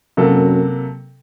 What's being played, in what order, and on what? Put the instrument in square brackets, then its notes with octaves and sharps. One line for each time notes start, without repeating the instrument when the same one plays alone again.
[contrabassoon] F#2 [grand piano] C3 F#3 A#3 F#4 A4